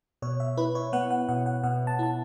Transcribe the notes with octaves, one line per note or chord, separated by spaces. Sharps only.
B2 C#5
E5
E4 B4
C#5
B3 F#5
F#5
B2 F#5
F#5
B2 F#5
A5
E4 A5